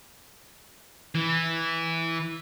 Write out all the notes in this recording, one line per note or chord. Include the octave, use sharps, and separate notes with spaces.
E3